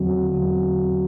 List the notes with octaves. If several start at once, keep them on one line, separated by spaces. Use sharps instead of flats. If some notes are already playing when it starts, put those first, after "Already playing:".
Already playing: E2 D3 F#3 C4 F#4
E2 D3 F#3 C4 F#4